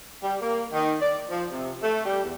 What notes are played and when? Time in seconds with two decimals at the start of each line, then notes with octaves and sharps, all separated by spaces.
0.23 G3
0.42 A#3
0.73 D#3
1.02 D5
1.30 F3
1.50 C3
1.83 A3
2.06 G3
2.24 E2